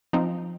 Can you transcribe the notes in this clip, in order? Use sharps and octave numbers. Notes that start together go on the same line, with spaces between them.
F3 C4 D#4